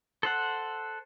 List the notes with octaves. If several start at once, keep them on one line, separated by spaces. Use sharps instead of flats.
A4 C5 F#5